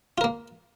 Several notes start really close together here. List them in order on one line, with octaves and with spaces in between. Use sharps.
F4 A#4 A#3